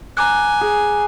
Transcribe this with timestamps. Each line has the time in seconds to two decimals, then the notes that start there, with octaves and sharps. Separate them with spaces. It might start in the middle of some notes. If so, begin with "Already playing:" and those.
0.17 G#5 A#5 D6 F#6
0.61 G#4